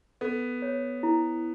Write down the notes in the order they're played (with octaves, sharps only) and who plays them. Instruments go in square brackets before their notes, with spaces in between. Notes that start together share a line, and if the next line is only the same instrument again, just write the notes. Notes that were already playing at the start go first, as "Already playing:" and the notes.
[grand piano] B3 [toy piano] A4
[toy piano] C#5
E4